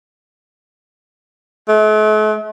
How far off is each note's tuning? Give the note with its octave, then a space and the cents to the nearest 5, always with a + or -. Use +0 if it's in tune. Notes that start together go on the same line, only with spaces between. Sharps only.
A3 -45